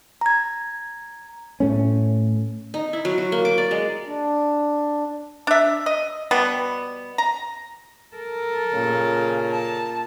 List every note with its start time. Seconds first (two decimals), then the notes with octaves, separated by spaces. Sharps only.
0.21 A#5 G#6
1.60 A2 A3 C#4
2.74 D#4
2.93 E4
3.05 F#3
3.18 F#4
3.32 A#3
3.45 D6
3.58 D5
3.71 G#3
4.07 D4
5.47 D4 E5
5.86 D#5
6.31 B2 G3 B3
7.18 A#5
8.16 A4 A#4
8.73 A#2 C#3
9.52 A5